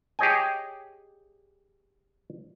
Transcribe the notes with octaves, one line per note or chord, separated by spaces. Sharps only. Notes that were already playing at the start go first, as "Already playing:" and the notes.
G4 G#4 C#5 D#5 G5 G#5